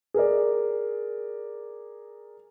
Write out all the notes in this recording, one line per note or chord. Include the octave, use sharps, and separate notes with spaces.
G#4 A#4 D5